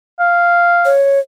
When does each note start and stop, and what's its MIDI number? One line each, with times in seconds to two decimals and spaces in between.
0.19 0.92 77
0.85 1.19 73